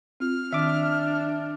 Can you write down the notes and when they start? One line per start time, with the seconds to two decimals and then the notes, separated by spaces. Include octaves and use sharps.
0.20 C4 F4 F6
0.53 D#3 D4 E5 D6